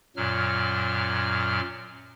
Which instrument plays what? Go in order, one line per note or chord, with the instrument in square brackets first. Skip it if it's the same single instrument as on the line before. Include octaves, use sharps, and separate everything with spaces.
[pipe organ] F#2 A#2 F#3 F6